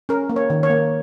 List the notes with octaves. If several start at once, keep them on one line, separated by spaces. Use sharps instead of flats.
C#4 A#4
A#3
C#5
D#3
C#5
A#3